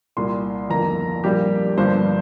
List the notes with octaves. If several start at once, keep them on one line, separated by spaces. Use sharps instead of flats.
C2 A#2 A#3 C6
G1 F2 D#3 A#3 A#5
A#1 A#2 G3 A#3 G4
G1 G2 F3 A#3 C5